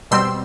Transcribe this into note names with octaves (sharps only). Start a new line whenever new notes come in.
B2 G3 C4 C6 E6